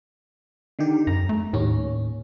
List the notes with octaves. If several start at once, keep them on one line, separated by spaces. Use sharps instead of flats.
D3 D#3 G4
F#2 A#5
A3
D#2 A2 C#4